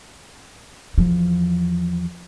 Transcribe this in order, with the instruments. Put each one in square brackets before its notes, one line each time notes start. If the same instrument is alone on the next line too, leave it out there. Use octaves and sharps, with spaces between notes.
[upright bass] E2 F3